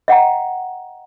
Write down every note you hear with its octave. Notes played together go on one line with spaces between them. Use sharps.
D#5 F#5 G5 A#5